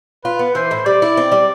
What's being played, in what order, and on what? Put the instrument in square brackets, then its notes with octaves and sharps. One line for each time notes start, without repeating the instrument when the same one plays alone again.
[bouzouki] F4 [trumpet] B4
[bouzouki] B3
[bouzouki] E3 [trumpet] C5
[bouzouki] A2
[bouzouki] G3 [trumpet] D5
[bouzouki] E4
C4
G3